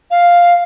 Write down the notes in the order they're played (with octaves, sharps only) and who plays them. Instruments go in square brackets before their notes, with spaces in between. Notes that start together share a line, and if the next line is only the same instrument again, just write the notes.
[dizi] F5